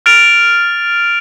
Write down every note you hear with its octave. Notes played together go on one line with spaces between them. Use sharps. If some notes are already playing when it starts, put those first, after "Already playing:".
F6 A6 D7 F7